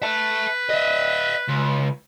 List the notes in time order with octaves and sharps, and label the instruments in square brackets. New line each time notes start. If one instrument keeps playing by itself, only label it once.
[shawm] B4 [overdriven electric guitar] E5 A5
[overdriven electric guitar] D#5 E5
C#2